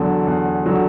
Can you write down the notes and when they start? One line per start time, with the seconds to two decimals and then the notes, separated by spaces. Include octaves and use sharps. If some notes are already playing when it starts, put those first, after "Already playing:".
Already playing: E2 D3 F#3
0.27 E2
0.66 D3 F#3